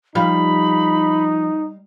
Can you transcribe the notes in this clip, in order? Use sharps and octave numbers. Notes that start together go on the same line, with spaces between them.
F3 G3 D#4 F5 B5